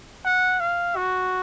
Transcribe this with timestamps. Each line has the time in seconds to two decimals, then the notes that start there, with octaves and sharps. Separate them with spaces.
0.25 F#5
0.60 F5
0.96 F#4